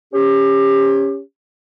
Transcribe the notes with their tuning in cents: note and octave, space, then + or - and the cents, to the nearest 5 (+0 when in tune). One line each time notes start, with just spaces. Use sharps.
C#4 +0 G4 +25